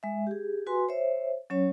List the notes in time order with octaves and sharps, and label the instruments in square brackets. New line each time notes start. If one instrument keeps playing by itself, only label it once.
[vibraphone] G#3 E5
G4 G#4
F#4 B4 G#5 C6
C5 C#5 E5
F#3 C#4 C#5